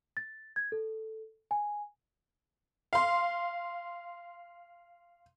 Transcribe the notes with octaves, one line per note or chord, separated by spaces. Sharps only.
A6
G#6
A4
G#5
F5 C6